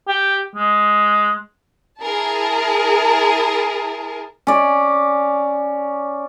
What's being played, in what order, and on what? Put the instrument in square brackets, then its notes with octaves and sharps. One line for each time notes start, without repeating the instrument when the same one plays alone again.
[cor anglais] G4
G#3
[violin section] E4 G#4 A#4 A5
[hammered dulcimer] C#4 D5